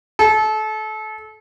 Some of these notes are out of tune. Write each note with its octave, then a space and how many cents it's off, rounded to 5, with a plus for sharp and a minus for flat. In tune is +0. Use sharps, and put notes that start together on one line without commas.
A4 -30